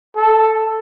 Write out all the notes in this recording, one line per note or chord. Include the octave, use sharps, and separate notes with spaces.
A4